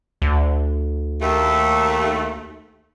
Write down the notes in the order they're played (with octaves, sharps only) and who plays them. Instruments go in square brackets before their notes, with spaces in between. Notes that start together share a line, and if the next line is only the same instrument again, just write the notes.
[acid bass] D2
[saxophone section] D#2 A3